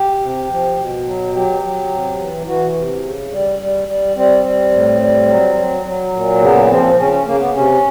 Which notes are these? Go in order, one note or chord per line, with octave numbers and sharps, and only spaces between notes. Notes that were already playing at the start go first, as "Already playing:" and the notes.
Already playing: G4
C3
F3
B2
F#3
F#3 G4
F#3
C3
E3
E3 F#4
C3
C#3
G3
G3
G3
G3 C4
G3
A2
G3
F#3
F#3
F#3
A#2
C#3 B3
B3
F3 C4
C#3 C#4
C#4
C#3 A#3
B3
C3 C#4